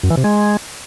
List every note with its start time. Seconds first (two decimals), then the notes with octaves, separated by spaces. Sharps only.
0.03 F#2
0.10 E3
0.17 C3
0.24 G#3